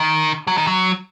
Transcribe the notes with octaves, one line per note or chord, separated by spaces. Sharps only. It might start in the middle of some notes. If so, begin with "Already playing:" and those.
Already playing: D#3
F#3
D#3
F#3